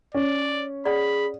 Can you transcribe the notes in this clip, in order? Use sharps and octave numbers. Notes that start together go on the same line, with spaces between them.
C#4 D5
G#4 D5 F#5 B5